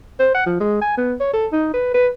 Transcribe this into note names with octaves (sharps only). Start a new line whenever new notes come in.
C5
F#5
F3
G#3
G#5
B3
C#5
A4
D#4
B4
B4